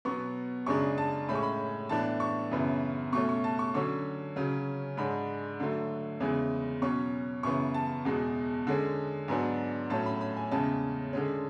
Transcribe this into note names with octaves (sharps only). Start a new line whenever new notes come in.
B2 F#3 B3 C#6
F#2 C#3 G#3 D4 C#6
A5
A2 G#3 C#4 B5
C#6
B5
A2 E3 B3 D4 A5
C#6
F#2 C#3 E3 B3
B2 A3 C#4 C#6
C#6
A5
C#6
D3 F#3 C#4 C#6
C#3 F#3 C#4
G#2 G#3 D4 B5
D3 F#3 A3
E2 C#3 E3 G#3
B2 F#3 C#4 C#6
F#2 C#3 E3 B3 C#6
A5
E2 B2 G#3
D3 G#3 C#4
G#2 F#3 B3 D4 G#5
A2 F#3 C#4 A5
B5
B5
G#5
E2 C#3 G#3 C#4 A5
D3 G#3 C#4